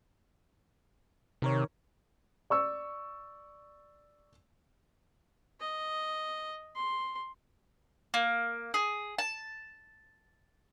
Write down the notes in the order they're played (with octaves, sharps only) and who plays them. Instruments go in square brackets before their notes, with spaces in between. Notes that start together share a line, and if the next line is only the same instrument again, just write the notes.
[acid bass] C3 [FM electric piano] D#3 A#4 C#5
[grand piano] D5 C#6 E6
[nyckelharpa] D#5
C6
[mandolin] A#3
G#4
A5